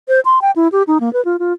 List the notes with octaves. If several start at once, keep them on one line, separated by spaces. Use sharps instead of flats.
C5
C6
G5
E4
G4
D#4
A#3
B4
F4
F4